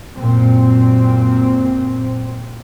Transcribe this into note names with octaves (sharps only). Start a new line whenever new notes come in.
F#2 A#2 C4